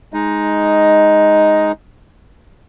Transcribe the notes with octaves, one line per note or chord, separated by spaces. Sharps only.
G#3 D#4